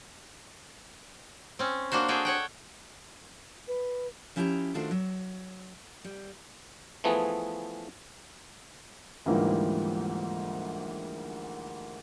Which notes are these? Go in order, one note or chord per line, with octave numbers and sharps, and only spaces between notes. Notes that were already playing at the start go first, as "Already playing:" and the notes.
C4 C#4
A#3 D4 F#4 C5
F#4 G#4 A4 G5
C#5 F#5 G5
B4
F3 C#4 E4 G4 G#5 A#5
D#3 A3 D4 F4 F#4 C5
F#3
G3
E3 F3 A3 B3 G#4
D2 G#2 E3 F3 G3 A#3